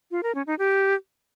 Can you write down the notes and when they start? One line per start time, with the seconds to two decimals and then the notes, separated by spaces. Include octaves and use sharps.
0.11 F4
0.23 A#4
0.35 C#4
0.47 D#4
0.59 G4